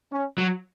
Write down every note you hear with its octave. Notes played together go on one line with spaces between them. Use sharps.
C#4
F#3